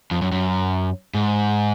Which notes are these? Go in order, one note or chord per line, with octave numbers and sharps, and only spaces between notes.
F2
F#2
F#2
G#2